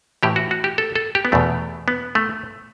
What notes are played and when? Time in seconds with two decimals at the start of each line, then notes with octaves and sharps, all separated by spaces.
0.23 A2 E3 G4
0.36 F#4
0.51 F#4
0.64 G4
0.78 A4
0.96 A4
1.15 G4
1.25 B3
1.32 E2 B2 A3
1.88 B3
2.15 A3